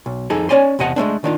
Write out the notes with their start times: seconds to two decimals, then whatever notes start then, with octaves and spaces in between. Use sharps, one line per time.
0.06 B1
0.30 F2 D#4 G#4 A4
0.49 C#4 C#5 D5 G#5 C6
0.79 E2 C3 D#5 F#5 A5
0.96 G#3 A3 C4 D4
1.24 D#3 D4 F4